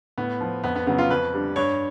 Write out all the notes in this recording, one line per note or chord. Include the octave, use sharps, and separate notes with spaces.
A2 B3
F3
F2 B3
B3
C#3 F#3 B3
F4
F2 B4
D3 G3
G2 C#5